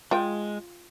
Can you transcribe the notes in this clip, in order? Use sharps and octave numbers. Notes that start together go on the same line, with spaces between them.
G#3 F4 G5